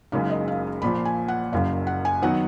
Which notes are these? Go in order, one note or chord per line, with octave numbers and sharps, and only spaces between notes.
F#1 F#2 C#3 G#3 D#4 F5
D#5
F5
A#1 A#2 F3 B5
G#5
F#5
F#1 F#2 C#3 F5
F#5
G#5
D#3 F#3 B3 D#4 F#5